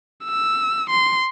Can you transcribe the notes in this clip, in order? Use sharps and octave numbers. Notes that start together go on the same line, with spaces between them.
E6
C6